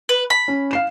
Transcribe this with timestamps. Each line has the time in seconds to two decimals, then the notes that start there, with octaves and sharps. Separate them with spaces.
0.09 B4
0.30 B5
0.48 C#4
0.71 F5 C7 E7